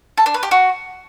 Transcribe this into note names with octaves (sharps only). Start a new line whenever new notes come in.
A4
D4
B4
G4
F#4